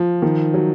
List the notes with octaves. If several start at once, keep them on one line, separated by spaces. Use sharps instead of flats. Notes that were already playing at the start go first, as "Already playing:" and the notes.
Already playing: F3
D#3
F#3